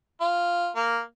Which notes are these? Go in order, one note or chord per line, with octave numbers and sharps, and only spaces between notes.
F4
A#3